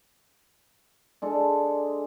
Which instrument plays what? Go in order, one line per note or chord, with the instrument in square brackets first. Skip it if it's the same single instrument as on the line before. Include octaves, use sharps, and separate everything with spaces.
[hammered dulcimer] G#3 D4 A4